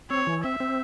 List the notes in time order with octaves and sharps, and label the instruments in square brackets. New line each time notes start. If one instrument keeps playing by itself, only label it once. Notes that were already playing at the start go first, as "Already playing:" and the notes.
[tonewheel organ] C4 [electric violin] C#5
[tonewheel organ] E3
[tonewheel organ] C4 [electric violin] E5
[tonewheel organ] C4